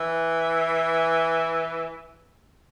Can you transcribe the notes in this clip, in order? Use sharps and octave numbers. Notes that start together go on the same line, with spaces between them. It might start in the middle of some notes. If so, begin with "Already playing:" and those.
Already playing: E3